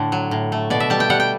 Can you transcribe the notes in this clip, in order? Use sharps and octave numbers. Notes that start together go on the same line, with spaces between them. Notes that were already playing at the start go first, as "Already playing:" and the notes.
Already playing: A2 D3 A3
F#3
A2
A3
B2 D5
E5
G3 A5
G5
G3 F#5
G5